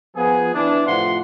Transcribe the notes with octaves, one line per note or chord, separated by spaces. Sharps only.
F3 B3 G#4
E3 D4
A2 C3 F3 F4 F#5 C6